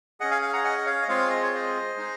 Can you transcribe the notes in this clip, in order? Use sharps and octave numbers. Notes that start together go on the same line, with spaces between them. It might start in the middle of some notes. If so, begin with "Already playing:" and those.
C#4 G#4 D#5 F#5
F5 G#5
F5 G#5
F#5 A#5
D#5 F#5
D#5
C#5 F5
D#5
G#3 C4 F4 G#4 C#5 F5
D#5
C#5
C5 D#5
G#3 D#4 G#4